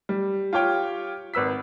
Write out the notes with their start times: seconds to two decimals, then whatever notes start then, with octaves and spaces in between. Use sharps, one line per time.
0.09 G3
0.53 F4 G4 C#5 G5
1.34 G#1 B4 E6 B6